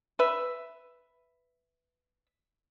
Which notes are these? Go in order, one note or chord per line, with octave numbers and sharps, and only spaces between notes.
B4 E5